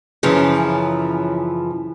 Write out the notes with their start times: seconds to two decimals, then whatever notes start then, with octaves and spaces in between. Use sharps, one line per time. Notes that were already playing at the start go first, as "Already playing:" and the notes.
0.23 F#2 C#3 E3 F3